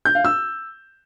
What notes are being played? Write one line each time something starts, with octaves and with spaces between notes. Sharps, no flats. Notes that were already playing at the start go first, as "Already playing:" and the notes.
G6
F5
E6